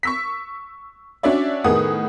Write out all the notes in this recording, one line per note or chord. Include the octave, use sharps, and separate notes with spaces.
C#6 E6 B6
C#4 D4 F#4 C#5 D5 E5
A2 D#3 B3 G#4 F#5 D#6